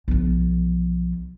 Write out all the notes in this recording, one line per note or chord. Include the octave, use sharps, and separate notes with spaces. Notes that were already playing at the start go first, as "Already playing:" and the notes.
B1 F3